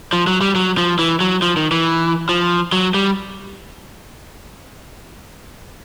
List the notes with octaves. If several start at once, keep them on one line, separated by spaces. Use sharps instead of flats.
F3
F#3
G3
F#3
F3
E3
F#3
F3
D#3
E3
F3
F#3
G3